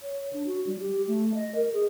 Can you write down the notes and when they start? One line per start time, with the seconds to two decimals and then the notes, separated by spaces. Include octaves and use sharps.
0.03 C#5
0.33 D4
0.46 F#4
0.67 G3
0.80 G4
1.07 A3
1.35 D#5
1.55 A#4
1.74 G#4